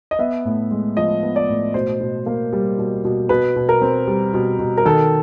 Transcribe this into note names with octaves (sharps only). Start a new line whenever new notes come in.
D#5
B3 E5
A2
G#3
F3 D#5
B3
D5
A2
B2 C5
B2
A#3
G3
B2
B2
B2 B4
B2
A#4
C4
G3
B2
B2
A#4
D#3 A4